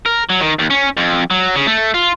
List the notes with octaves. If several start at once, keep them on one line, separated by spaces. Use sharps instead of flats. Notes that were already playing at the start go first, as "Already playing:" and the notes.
A#4
F#3
D#3
D#2
C#4
F2
F#3
C#3
A3
F4